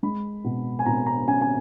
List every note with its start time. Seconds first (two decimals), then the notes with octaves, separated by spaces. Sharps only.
0.03 G#3 B5
0.44 B2
0.79 G#5
0.86 B2 A#5
1.06 A#5
1.27 C#4 G#5
1.41 G#5